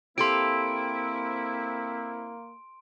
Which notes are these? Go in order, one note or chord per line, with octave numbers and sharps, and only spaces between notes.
A#3 C4 E4 G4 A4 F5 C6 D7